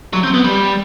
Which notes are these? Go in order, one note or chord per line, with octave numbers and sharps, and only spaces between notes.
F#3
C4
B3
G3